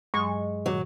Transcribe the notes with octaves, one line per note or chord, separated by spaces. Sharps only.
G2 F#3 G#3 C#6
A#2 D#3 F#3